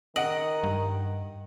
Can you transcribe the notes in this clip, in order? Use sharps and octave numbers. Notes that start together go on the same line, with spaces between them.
D#3 D#5 F#5 D7 F#7
G2